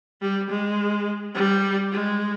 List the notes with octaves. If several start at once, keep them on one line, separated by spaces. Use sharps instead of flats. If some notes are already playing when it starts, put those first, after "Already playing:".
G3
G#3
G3
G#3